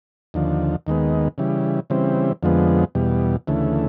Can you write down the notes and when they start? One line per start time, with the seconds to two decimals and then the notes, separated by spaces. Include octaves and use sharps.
0.34 D#2 D3 F3
0.87 D#2 D#3 G#3 B3
1.38 C#3 E3 G3
1.90 C#3 E3 G3 C4
2.43 F2 D3 F3 G#3 B3
2.95 E2 B2 G3
3.47 D2 C#3 E3 A3